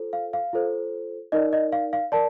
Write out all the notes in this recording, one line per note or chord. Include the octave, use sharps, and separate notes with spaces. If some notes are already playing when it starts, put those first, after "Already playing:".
Already playing: F4 A4 C5
F5
F5
F4 A4 C5
D#4 A#4 D5 D#5
D#5
F5
F5
A#4 D5 A5